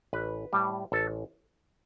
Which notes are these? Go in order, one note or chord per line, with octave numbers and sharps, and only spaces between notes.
A1 B4
A2 G3
A1 A4